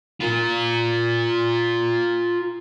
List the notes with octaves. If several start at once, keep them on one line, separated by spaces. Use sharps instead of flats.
F4 A#4